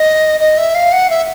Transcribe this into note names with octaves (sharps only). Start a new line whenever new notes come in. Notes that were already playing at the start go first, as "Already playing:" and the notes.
Already playing: D#5
D#5
E5
F5
F#5
E5